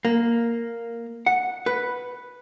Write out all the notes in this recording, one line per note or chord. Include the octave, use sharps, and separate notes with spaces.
A#3
F#5
B4